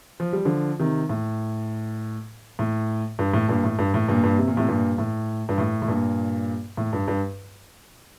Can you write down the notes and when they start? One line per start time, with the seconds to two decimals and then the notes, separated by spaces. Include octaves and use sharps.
0.20 F3
0.33 G3
0.45 D3 F3
0.79 C3 D#3
1.09 A2
2.59 A2
3.19 G2
3.34 A2
3.48 G2 A#2
3.64 A2
3.79 G2
3.94 A2
4.08 G2 A#2
4.23 G2 A#2
4.38 C3
4.48 A#2
4.57 A2 C3
4.68 G2 A#2
4.98 A2
5.49 G2
5.58 A2
5.82 A2
5.88 G2 A#2
6.77 A2
6.93 G2
7.08 G2